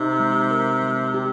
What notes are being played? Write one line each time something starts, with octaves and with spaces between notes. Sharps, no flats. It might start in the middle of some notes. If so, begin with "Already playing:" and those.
Already playing: C3 D#4
G#3
A#4
G#3
G4